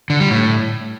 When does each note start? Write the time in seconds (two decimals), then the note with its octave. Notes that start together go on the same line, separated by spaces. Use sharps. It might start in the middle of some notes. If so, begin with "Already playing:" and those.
0.10 D3
0.20 G3
0.30 A2